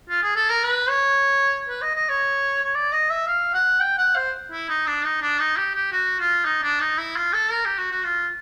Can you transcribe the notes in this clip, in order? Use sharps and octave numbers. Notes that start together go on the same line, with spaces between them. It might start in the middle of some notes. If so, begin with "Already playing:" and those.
F4
G#4
A4
A#4
B4
C#5
B4
D#5
D#5
C#5
C#5
D5
D#5
E5
F5
F#5
G5
F#5
C5
E4
D#4
D4
D#4
D4
D#4
G4
G4
F#4
F4
D#4
D4
D#4
E4
F4
A4
A#4
G4
F#4
F#4
F4